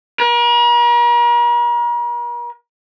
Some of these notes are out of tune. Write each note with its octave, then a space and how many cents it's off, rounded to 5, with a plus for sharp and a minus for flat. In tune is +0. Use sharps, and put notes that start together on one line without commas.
A#4 +40